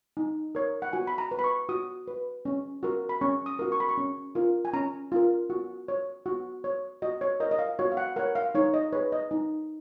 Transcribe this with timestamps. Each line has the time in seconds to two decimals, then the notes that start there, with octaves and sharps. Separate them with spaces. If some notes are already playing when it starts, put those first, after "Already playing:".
0.17 D#4
0.55 A#4 C#5
0.82 F#5
0.93 F#4 G#5
1.07 B5
1.18 A#5
1.31 B4
1.39 B5
1.44 C#6
1.69 F#4 D#6
2.08 B4
2.45 C#4
2.83 F#4 A#4
3.09 B5
3.21 C#4 C#6
3.46 D#6
3.59 F#4 A#4
3.72 C#6
3.80 B5
3.89 C#6
3.98 C#4
4.35 F4 A#4
4.65 G#5
4.73 C#4 A#5
5.12 F4 A#4
5.50 F#4
5.88 C#5
6.26 F#4
6.64 C#5
7.02 F#4 D#5
7.21 C#5
7.40 A#4 D#5
7.43 C#5
7.51 D#5
7.59 F5
7.79 F#4 C#5
7.92 F5
7.97 F#5
8.16 A#4 C#5 F#5
8.35 F5
8.55 D#4 C#5
8.74 D#5
8.93 G#4 B4 C#5
9.12 D#5
9.31 D#4